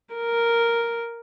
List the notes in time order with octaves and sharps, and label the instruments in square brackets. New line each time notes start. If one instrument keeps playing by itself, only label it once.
[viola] A#4